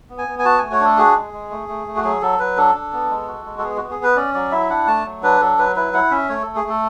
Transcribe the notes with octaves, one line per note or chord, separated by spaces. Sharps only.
B3
G#5
B3
G#5
F#4 A5
A3 G#5
C#5
D4 A4
F#4 G#4
G#3
G#3
A3
A3
A3
F#4
F#3 G#4
F#3 A4
F#3 B4
D4 A4
D4
B3
G#3
F#4
G#3
A4
B3 G#4
B3 F#4
G#4
B3 B4
C#4 D5
F#3 D5
E4 E5
D4 F#5
A3 A5
F#3
D4 B4
F#3 A4
F#3 B4
E4 B4
E4 F#5
C#4 E5
A3 C#5
A3 A4
G#4
A3 A4